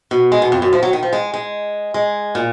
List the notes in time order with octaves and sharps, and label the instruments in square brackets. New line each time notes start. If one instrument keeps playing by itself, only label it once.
[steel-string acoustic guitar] B2
G#3
B2
F2
F#2
F3
F#3
D#3
F3
G#3
G#3
G#3
A#2